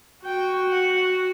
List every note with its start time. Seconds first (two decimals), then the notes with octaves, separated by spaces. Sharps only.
0.25 F#4 G5
0.69 F#5